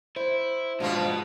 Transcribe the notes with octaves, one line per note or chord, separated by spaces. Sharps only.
E4 C5
G#2 B2 F3 G#3 B3 D4